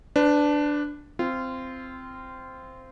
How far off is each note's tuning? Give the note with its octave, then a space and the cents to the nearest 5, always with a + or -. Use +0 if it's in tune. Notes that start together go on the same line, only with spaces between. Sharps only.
D4 +0 B4 +30
C4 -5 F4 -20